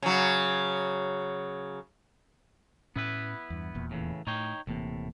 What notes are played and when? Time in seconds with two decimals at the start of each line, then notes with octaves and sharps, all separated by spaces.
0.02 C#3 F#3
2.96 A2 B3 C#4 E4 B4
3.50 E2 G2
3.74 D#1 E2 A#2
3.91 A2 C#3 E3
4.27 A2 D#4 C#5 G5
4.67 D#1 D2 A2 C3 E3 A#3